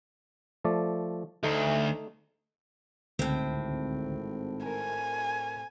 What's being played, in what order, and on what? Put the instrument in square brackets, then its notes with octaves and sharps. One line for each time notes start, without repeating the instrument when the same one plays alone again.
[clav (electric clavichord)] F3 A3 D5
[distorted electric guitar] D2 [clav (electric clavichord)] A3 D#4
[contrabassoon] G#1 [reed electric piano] C#2 D3 [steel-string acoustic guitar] A2 C4
[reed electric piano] A#4 [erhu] G#5